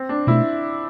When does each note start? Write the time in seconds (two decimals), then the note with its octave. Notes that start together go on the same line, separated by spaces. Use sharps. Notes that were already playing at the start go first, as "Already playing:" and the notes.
Already playing: C4
0.09 D4
0.27 B2 A3 E4